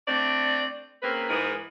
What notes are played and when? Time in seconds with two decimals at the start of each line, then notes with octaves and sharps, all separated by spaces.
0.08 A3 C4 D4 D5
1.03 C#3 A#3 C4 A#4 B4
1.29 G#2 E3 G#3 B3 G#4 A#4